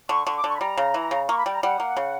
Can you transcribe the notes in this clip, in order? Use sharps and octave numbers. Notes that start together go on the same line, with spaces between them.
D3 C#6
D3 C#6
D6
D3
C#6
B5
G3 A#5
C#3
E3
C#3
A#3 C#6
B5
G3 G5
A#5
G3 F#5
A#3
C#3